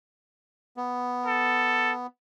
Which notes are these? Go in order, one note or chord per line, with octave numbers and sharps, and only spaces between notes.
B3
A4